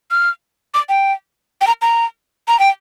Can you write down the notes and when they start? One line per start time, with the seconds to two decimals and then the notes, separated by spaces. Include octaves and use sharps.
0.11 F6
0.74 D6
0.89 G5
1.61 G5
1.67 A#5
1.82 A#5
2.48 A#5
2.59 G5